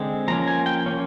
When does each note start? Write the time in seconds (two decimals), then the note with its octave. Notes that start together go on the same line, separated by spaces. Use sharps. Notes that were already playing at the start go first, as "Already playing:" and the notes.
Already playing: D3 G#3 C4
0.28 F3 A#3 C#4 A#5
0.48 G#5
0.66 G5
0.86 F3 A#3 C#4